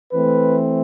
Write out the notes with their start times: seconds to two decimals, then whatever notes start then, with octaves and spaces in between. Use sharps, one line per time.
0.13 E3 A3 C4 B4